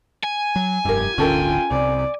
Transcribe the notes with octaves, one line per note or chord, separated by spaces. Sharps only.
G#5
F#3
F1 G2 E4 G4 A#4
D1 G1 D3 C#4 F4 A4 A#4 G5
C2 C3 D5